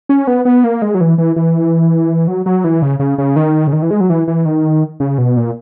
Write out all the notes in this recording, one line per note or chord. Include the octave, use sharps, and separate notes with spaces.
C#4
B3
B3
A#3
G#3
F#3
E3
E3
E3
F#3
F#3
E3
C#3
C#3
C#3
D#3
C#3
D#3
E3
G#3
F#3
E3
E3
D#3
C#3
B2
A#2